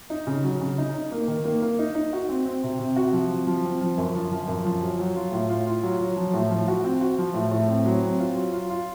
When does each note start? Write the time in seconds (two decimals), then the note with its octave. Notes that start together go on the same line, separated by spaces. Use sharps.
0.10 D#4
0.27 C#3
0.44 F#3
0.61 C#3
0.78 D#4
0.95 D#4
1.12 A#3
1.28 D#3
1.44 A#3
1.62 A#3
1.79 D#4
1.95 D#4
2.13 F#4
2.29 C4
2.46 C4
2.63 C3
2.79 C3
2.96 F#4
3.13 F3
3.31 C4
3.47 F3
3.65 C4
3.81 F3
3.98 F#2
4.15 F3
4.31 F3
4.48 F#2
4.65 F3
4.82 F#3
4.99 F#3
5.16 F4
5.32 A2
5.49 F4
5.66 F4
5.83 F#3
6.01 F#3
6.17 F3
6.34 A2
6.51 F3
6.68 F#4
6.84 C4
7.01 F#4
7.18 F3
7.34 A2
7.51 A2
7.68 C4
7.85 F#3
8.03 C4
8.19 F4
8.35 F#3
8.53 F4
8.70 F4